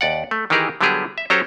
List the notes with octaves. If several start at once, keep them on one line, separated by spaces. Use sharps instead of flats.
D#2 D5 F#5
A3
D#3 E3 D#4 G4 G#4 A#4
D3 F#3 G3 B3 G4 G#4
E5
F#3 C#4 G4 A4 C5 A#5